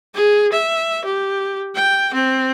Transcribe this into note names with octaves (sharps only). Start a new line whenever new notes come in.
G#4
E5
G4
G5
C4